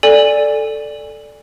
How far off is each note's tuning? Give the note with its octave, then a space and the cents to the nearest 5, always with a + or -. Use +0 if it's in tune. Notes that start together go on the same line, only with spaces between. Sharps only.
A4 +0 D5 +0 G#5 -15